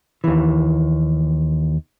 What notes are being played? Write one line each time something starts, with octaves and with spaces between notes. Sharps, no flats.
D#2 E3